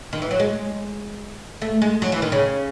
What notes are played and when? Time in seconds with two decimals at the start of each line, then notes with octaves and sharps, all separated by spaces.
0.13 D#3
0.22 E3
0.31 F#3
0.40 G#3
1.62 A3
1.82 G#3
2.02 F#3
2.12 E3
2.22 D#3
2.32 C#3